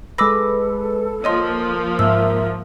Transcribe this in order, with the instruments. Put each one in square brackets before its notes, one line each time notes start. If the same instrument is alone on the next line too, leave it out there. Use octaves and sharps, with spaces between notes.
[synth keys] G#3 B4 [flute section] A4 [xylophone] D6 E6 A#6
[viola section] F3 A#3 [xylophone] C#5 D#5 C6 [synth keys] D#6
[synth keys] G#2 [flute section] A#4 E5 [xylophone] E6